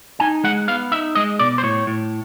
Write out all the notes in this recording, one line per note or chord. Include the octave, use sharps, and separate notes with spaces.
D#4 G#5
G#3 F#5
B3 F5
D#4 E5
G#3 D#5
B2 D5
C5
A2 C#5
A2